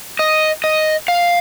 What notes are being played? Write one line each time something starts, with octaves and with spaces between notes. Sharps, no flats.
D#5
D#5
F5